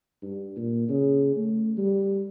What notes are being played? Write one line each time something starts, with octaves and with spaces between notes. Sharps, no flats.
G2
A#2
C#3
A3
G3